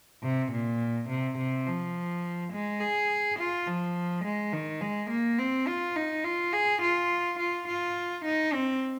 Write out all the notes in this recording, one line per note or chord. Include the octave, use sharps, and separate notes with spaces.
C3
A#2
C3
C3
F3
G#3
G#4
F4
F3
G#3
D#3
G#3
A#3
C4
F4
D#4
F4
G#4
F4
F4
F4
D#4
C4